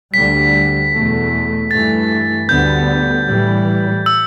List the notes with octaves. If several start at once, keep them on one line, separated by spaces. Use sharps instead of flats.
D2 D3 G3 B6
E2 B2 A3
G2 E3 A3 A6
D2 D3 G3 B3 G6
A2 E3 G3
E6